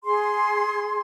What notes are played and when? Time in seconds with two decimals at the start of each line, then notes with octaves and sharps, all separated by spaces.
0.05 G#4 C6